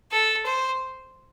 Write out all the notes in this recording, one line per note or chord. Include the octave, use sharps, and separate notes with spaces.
A4
C5